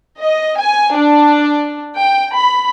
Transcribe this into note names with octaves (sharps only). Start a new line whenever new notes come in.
D#5
G#5
D4
G5
B5